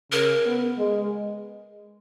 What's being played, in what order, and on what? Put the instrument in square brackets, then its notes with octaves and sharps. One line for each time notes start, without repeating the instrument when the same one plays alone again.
[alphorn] C#3 [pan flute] A#4
[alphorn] B3
G#3